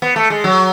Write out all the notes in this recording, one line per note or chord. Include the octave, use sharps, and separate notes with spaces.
B3
A3
G#3
F#3